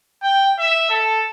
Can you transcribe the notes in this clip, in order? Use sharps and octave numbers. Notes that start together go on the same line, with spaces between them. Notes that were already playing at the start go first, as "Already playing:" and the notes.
G5
E5
A4